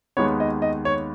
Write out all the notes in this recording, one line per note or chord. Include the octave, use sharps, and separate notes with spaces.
D#2 D#3 G#3 B3 C#5
D#5
D#5
C#5